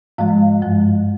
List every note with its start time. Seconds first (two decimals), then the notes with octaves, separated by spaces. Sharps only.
0.18 G#2 F3 G#3 F5
0.62 G2 F3 G#3